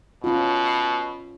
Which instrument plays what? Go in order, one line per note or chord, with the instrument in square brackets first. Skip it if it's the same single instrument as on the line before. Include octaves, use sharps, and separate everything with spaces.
[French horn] B2 [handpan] C#4 F4